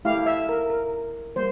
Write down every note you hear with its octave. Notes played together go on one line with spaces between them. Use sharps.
A3 E4 G4 F5
E5
A#4
A#4
G3 A#3 C5